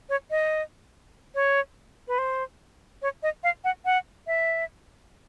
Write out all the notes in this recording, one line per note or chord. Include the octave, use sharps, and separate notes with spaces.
C#5
D#5
C#5
B4
C5
C#5
D#5
F5
F#5
F#5
E5